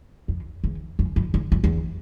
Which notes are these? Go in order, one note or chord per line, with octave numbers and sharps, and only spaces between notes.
F2
E2
F2
F2
E2
F2
E2